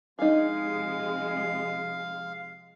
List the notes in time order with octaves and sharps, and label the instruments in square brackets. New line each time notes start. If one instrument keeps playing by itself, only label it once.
[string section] C3 F3 G#3 [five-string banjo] D#4 G#4 [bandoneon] F5